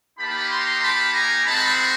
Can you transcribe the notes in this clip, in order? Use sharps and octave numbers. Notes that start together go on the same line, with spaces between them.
A#3 D#4 G4 A5 B5
A#5 C6
A5 B5
G#5 A#5
G#3 C4 D#4 F#4 A5 B5